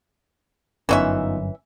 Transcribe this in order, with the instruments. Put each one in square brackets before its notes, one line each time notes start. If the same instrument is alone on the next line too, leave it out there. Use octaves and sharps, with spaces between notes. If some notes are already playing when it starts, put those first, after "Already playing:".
[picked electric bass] G1 F#2 [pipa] E3 C#4 E5 [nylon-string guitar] B3 D#4 F4